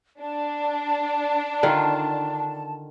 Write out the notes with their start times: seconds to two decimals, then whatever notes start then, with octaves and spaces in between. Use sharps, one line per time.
0.20 D4 A5
1.63 D3 D#3 F4